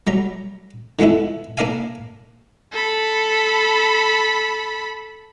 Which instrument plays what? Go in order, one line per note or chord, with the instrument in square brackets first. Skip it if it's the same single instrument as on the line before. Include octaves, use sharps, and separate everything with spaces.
[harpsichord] F#3 G3 A#5
D3 F3 G#3 B3 E4
A#3 D4 A#4 D5 F5 G#5
[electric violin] A4 B5